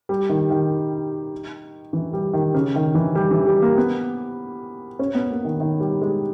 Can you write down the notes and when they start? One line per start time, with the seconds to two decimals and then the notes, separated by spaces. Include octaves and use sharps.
0.09 G3
0.29 D#3
0.50 D#3
1.93 E3
2.13 G3
2.33 D#3
2.54 C#3
2.75 D#3
2.95 E3
3.15 G3
3.31 E3
3.47 G3
3.62 A#3
3.77 B3
4.99 C#4
5.15 B3
5.30 A#3
5.45 D#3
5.60 D#3
5.80 G3
6.02 G#3